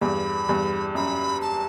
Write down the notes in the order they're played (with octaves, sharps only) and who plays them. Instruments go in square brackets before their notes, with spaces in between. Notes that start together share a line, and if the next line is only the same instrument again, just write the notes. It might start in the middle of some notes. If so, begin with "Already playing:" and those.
[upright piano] E2 G2 [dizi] B5
[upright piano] E2 G2
[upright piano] F#2 [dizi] B5
[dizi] A5